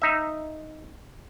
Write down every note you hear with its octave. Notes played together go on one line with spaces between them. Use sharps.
D#4 E5